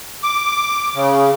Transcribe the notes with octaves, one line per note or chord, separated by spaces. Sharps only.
D6
C#3